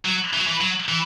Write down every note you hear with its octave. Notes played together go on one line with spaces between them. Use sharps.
F#3
E3
F#3
E3
F#3
E3